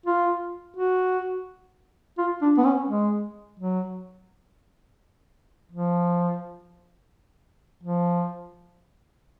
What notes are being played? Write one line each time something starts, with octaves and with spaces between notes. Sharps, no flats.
F4
F#4
F4
D4
B3
C#4
G#3
F#3
F3
F3